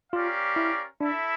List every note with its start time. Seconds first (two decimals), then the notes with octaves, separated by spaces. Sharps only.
0.12 C#4 F4 G4 A#4 D5 F5
0.56 E4
1.00 D4 E4 A4 E5